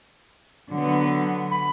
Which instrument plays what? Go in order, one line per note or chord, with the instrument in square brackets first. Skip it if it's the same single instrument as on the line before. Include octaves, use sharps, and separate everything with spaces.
[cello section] D3 F#3 B3
[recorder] B5